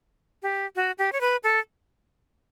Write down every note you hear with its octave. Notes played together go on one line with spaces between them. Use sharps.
G4
F#4
G4
C#5
B4
A4